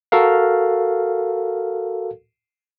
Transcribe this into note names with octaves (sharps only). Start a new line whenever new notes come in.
F#4 A4 A#4 F5